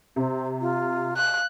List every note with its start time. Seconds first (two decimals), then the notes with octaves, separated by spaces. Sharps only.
0.16 C3 C4
0.61 F4
1.17 F5 F#6